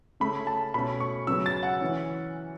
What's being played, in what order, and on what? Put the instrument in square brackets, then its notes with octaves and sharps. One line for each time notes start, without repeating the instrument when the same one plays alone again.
[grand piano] C#3 A3 C#4 B5
A5
B2 A3 C#4 B5
C#6
C#3 F#3 B3 E6
A6
F#5
E3 C#4